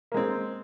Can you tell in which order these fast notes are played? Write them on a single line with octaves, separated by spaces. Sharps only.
A#3 G#3 C4